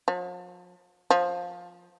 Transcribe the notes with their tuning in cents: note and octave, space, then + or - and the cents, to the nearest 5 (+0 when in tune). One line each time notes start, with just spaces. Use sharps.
F3 +45
F3 +15